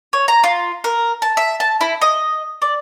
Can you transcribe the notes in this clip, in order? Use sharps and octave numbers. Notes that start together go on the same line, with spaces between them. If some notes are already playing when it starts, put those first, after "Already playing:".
C#5
A#5
F4
A#4
A5
E5
A5
E4
D#5
D5